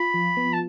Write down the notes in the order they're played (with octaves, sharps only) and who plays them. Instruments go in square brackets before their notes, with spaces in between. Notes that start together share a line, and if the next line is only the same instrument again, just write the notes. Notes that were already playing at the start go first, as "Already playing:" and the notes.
Already playing: [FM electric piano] F4 [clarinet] B5
[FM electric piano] F3
B3
[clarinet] A5